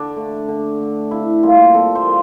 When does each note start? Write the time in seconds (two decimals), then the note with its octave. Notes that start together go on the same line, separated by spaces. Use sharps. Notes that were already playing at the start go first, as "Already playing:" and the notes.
Already playing: D3 D4
0.17 A3
0.48 D3
0.80 A3
1.11 C3 E4
1.43 G3 A#3 F4
1.73 C3 A4
1.95 C5
2.06 G3 A#3